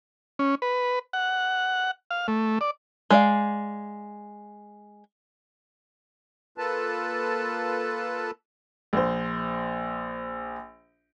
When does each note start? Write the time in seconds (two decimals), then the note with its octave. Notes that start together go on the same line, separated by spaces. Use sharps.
0.39 C#4
0.62 B4
1.13 F#5
2.11 F5
2.28 A3
2.61 D5
3.11 G#3 D5 F5
6.58 A#3 F4 A4 B4 A5
8.93 A#1 C5